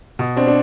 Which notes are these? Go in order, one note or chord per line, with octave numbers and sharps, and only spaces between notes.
B2
C4 D4
D4